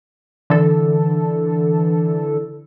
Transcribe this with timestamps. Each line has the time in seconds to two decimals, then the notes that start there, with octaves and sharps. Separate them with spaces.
0.50 D3 E3 A4